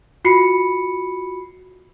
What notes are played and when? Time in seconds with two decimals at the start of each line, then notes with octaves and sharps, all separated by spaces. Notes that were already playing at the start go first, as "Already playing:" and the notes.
0.25 F4 F#4 B5 C7 C#7